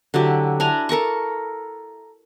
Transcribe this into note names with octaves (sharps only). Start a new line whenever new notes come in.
D3 F#3 E4 G4
D4 E4 G#5 A#5
A4 A#4 A#5 C#6